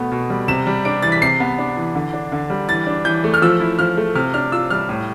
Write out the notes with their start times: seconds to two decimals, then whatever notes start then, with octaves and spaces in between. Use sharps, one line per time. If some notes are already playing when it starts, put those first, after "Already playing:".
Already playing: B2 A3 B3
0.12 B2
0.30 G3
0.48 C3 E7
0.67 G3
0.85 D4 D7
1.02 E3 A6
1.12 B6
1.22 C3 C7
1.40 B3
1.58 D4
1.77 E3
1.95 D3
2.13 D4
2.32 D3
2.50 G3
2.69 E3 A6
2.87 D4
3.05 E3 G6
3.24 A3
3.34 F6
3.42 F3 E6
3.60 E4
3.79 F3 F6
3.97 A3
4.15 C3 F6
4.34 D4 F6
4.52 F4 E6
4.70 G3 F6
4.89 A2